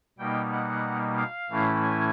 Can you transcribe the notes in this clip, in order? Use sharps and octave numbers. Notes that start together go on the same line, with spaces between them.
B2 G3 A#3 D#4 G5
F#5
F5
A2 E3 A3 C#4 E4
G#5